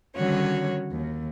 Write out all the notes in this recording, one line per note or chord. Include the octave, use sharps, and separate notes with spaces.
D3 D#3 G3 C#4 F#4 C#5
D#2